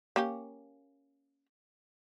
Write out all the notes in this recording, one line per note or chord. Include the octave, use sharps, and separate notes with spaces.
A#3 C#4 G4